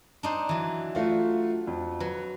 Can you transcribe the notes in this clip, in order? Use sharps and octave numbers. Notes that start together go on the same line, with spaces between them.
D4 D#4 C5
E3 F#3
A3 F4 F#4
F2
F#3 B4